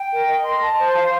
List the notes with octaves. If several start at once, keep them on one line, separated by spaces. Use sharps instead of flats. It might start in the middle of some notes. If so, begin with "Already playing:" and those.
Already playing: G5
A#4
D#5
C6
A5
C5
F5